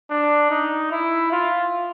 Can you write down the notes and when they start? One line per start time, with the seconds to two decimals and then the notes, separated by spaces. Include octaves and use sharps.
0.10 D4
0.50 D#4
0.91 E4
1.31 F4